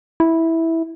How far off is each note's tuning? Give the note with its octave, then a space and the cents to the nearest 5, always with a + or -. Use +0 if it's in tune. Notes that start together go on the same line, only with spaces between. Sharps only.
E4 -10